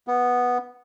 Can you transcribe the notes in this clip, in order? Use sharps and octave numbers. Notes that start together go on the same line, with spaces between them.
B3